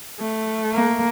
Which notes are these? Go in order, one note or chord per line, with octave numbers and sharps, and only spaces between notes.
A3
A#3